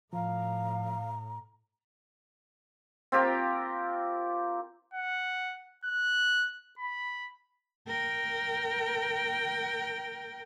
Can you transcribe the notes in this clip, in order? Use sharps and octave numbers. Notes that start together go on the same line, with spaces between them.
A2 F3 F5 A#5
C4 F4 G4 A#4
F#5
F#6
B5
A#4 G5